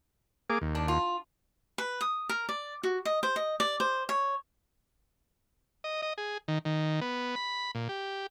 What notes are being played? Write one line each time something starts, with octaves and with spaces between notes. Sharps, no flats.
A#3 G#4 D6
D#2
D4
F4
B4
D#6
A#4
D5
F#4
D#5
C5
D#5
D5
C5
C#5
D#5
D#5
G#4
D#3
D#3
B3
B5
A#2
G4